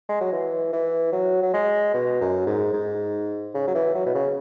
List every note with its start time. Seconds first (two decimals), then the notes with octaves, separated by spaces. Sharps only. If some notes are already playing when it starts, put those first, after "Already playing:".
0.09 G#3
0.21 F#3
0.33 E3
0.73 E3
1.13 F#3
1.43 F#3
1.54 G#3
1.94 B2
2.21 F#2
2.47 G#2
2.74 G#2
3.55 C#3
3.68 F#3
3.75 E3
3.95 F#3
4.06 B2
4.15 C#3